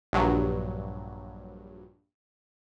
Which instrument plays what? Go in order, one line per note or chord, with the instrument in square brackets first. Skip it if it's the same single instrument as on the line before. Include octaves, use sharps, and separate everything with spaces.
[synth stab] A#1 G2 F#3